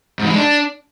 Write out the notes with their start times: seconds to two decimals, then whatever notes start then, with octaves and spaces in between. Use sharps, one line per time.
0.19 G#2
0.24 E3
0.30 G#3
0.35 D4